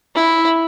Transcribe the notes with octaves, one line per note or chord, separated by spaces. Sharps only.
E4